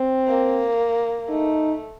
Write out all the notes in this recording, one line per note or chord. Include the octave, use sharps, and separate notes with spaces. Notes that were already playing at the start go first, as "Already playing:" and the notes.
Already playing: C4
A#3
A3 D#4